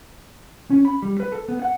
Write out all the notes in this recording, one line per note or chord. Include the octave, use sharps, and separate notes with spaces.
C#4
B5
G3
B4
A4
B3
F#5